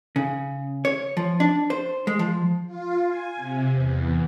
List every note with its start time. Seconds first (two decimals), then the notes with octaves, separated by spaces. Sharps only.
0.16 C#3
0.85 C#5
1.17 F3
1.40 D4
1.70 C5
2.07 G#3
2.19 F3
2.66 F4
3.07 G#5
3.36 C3
3.72 E2